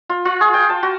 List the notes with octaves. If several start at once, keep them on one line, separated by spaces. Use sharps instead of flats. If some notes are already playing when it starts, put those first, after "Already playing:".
F4
F4
G#4
G5
A5
F#4